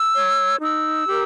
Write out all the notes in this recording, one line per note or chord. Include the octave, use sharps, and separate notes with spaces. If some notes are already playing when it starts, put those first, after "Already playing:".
Already playing: E6
C#5
D#4 E6
G4 A#4